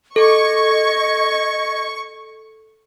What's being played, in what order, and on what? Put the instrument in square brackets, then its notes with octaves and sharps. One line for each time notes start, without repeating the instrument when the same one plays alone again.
[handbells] A4 [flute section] D#5 G#6 [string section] C#6